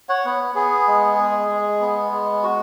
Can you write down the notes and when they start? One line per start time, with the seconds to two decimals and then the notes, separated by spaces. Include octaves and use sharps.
0.09 C#5 F#5
0.25 B3
0.55 B3 G#4
0.87 G#3
1.19 G#3
1.49 G#3
1.81 B3
2.12 G#3
2.43 F#4